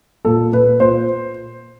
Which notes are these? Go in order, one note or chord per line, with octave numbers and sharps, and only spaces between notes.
A#2 A4
A#2 B4
A#2 C5